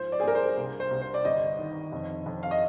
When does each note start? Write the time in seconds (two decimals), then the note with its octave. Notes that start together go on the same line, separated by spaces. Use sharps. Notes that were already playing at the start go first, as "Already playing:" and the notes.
Already playing: G#2 F3 C5
0.12 D5
0.20 G#4
0.23 G2 A#4
0.35 C5
0.57 C2
0.80 C5
0.91 C2
1.02 C5
1.14 D5
1.25 G1 D#5
1.59 D#3
1.92 F2
2.26 F2
2.43 F5
2.51 D#5